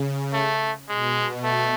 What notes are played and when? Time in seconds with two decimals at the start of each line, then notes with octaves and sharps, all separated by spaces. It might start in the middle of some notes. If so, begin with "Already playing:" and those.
Already playing: C#3
0.33 A3
0.89 B2 G#3
1.44 A3